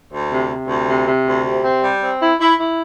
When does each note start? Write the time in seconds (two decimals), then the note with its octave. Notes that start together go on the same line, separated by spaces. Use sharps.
0.12 D2
0.31 C3
0.49 C3
0.68 D2
0.88 C3
1.06 C3
1.25 D2
1.44 C3
1.64 C4
1.82 G3
2.01 C4
2.20 E4
2.40 E4
2.58 E4